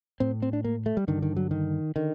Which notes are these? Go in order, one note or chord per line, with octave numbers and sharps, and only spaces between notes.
A2 C4
C4
D4
A#3
A3
G3
G2 D3 D#3
D#3
F#3
D#3
D3 D#3